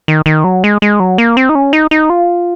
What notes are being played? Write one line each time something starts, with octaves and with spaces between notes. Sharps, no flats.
D#3
D#3
F#3
G#3
G#3
F#3
A#3
C4
D#4
C#4
D#4
D#4
F4